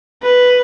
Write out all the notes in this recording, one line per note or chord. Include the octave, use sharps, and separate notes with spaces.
B4